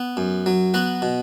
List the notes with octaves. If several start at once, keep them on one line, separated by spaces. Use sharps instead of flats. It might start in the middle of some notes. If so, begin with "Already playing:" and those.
Already playing: B3
F#2
F#3
B3 F#4
B2